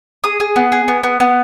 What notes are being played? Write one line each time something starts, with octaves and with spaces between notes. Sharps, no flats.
G#4 D#6
G#4
B3
G#4
B3
B3
B3